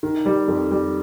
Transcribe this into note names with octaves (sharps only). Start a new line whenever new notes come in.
D#3
G3
F2
G3